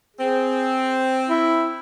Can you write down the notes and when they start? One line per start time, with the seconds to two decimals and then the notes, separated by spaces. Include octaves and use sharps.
0.17 C4 G#4
1.29 E4